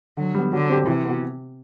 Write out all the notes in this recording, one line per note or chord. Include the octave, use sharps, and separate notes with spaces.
D3 F#3
G3 B3
D3 F#3
C4 G4
C3 E3
B3 F#4